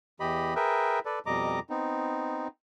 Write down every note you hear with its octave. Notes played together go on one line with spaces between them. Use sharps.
E2 E3 G4 D#5 B5
G#4 A#4 B4 E5 G5
A4 B4 D5
F2 B2 G3 D#5 A#5 D6
B3 C4 D#4